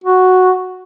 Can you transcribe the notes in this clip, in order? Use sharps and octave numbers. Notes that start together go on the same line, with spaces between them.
F#4